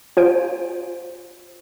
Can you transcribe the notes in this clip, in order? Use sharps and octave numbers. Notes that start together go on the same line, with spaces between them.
F4 C5 G#5 D7